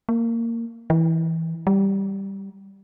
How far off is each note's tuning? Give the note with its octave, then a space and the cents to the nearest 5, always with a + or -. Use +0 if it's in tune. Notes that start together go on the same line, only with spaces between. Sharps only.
A#3 -15
E3 -15
G3 +0